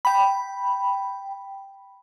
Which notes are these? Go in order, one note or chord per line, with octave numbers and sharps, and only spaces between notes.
G5 B5